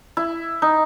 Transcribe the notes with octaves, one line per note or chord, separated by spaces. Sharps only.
E4
D#4